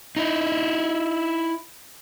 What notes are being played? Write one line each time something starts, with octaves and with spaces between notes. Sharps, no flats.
D#4 E4